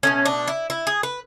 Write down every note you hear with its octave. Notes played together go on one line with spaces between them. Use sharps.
B2 F#3 A3 C#4
D4
E4
E4
G#4
B4